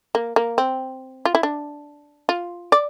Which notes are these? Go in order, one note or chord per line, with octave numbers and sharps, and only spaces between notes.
A#3
A#3
C4
F4
E4
D4
F4
D5